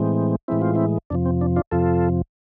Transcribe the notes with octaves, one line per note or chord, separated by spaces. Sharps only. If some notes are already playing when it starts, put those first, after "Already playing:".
Already playing: A2 E3 G#3 C4
A2 E3 G#3 C4 E4
F4
C4 E4
F2 C3 F3 D4
C4
D4
D4 F4
F2 C3 F3 F4 A4